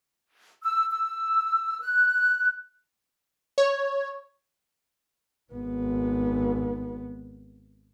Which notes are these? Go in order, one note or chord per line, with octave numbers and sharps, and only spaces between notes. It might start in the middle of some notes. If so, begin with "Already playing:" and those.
E6
E6
F#6
C#5
G#1 B3